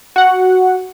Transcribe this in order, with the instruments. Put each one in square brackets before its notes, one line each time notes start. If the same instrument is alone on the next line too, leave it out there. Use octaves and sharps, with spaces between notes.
[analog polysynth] F#4 F#5